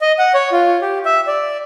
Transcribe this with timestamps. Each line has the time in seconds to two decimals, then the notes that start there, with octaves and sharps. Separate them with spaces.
0.01 D#5
0.18 F#5
0.34 C#5
0.52 F4
0.82 G4
1.05 E5
1.27 D5